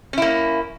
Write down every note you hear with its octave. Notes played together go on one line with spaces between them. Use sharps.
A#3 C#4 E4